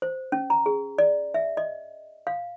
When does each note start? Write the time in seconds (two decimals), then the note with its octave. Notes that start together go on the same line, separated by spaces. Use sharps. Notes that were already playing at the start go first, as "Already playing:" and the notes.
0.02 C5
0.32 C#4
0.50 A#5
0.66 G#4
0.98 D5
1.34 E5
1.57 D#5
2.27 F5